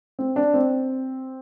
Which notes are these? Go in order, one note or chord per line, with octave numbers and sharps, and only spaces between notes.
C4
D4
C4